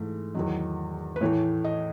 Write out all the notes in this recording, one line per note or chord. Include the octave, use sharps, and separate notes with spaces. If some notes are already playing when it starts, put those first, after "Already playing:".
Already playing: G#2 E3 A3
E2 D#3 F#3 D#5
B4
A2 E3 A3 C#5
D#5